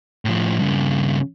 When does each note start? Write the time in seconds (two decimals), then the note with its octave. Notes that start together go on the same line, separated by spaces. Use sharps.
0.25 A2 F3
0.59 G2 C#3